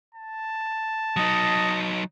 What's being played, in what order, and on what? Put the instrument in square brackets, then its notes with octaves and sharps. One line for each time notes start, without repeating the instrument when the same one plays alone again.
[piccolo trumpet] A5
[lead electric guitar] F#3 D#4 [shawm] D#5